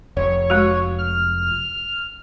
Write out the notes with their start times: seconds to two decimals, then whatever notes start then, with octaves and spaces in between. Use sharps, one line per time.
0.17 F1 C#5
0.50 G#3 F#4
0.98 F6